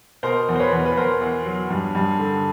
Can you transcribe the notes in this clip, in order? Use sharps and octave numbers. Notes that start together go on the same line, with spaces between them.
B2 A#4 C5
E2
C5
B4 C#5
E2
B4
E2 A#4 C5
E2
F#3
G2
G2
D3